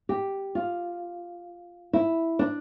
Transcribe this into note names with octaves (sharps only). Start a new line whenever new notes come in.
G4
F4
E4
D4